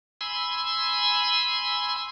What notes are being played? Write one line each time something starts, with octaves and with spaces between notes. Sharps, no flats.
G#5 B5 C6 E6